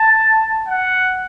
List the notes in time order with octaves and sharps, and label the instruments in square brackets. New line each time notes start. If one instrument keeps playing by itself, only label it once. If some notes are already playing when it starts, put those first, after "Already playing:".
Already playing: [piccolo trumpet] A5
F#5